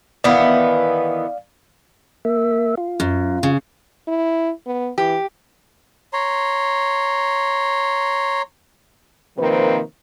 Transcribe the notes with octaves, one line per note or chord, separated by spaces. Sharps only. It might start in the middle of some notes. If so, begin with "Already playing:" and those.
D#3 E3 B3 D5 F5
A#3 E5
F4
F#2
C#3
E4
B3
E3 G4
C#5 A#5 C6
C3 D#3 F3 A#3 C4 B4